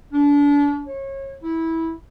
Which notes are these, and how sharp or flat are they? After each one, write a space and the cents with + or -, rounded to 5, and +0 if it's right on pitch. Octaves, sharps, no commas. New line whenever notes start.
D4 -35
C#5 -30
E4 -15